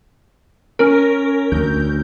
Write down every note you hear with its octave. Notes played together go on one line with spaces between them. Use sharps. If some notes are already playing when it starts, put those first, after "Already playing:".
C#4 A#4
D2 G6